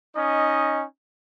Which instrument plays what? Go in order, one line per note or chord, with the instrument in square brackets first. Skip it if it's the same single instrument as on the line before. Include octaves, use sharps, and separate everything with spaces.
[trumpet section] C#4 D#4 D#5